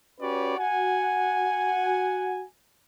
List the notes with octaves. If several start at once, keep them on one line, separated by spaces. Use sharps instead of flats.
C#4 F#4 G4 B4 C#5 D5
F#4 F#5 G#5